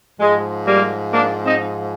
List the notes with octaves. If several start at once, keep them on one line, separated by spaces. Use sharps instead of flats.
G#2 F3 G#3
G3 A#3
A#3 D4
C4 D#4